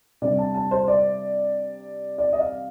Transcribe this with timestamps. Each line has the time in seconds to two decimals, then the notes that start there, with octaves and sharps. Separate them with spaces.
0.22 C3 G3 D4 D5
0.38 A5
0.55 A5
0.71 C5
0.88 D5
2.18 D5
2.33 D#5
2.41 F5